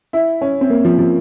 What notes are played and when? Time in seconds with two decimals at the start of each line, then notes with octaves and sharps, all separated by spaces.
0.13 E4
0.41 C#4
0.61 C4
0.70 A#3
0.85 F3
0.99 F3